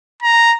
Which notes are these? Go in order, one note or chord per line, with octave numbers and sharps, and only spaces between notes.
A#5